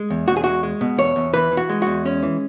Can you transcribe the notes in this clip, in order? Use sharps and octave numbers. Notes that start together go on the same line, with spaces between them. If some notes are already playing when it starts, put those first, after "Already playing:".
Already playing: G#3
E2
E2 F#4
G#4
G#3 F#4
G#3
B2
E2 C#5
E2
E3 B4
E3
F#4
G#3
E2 F#4
G#3 C#4
E3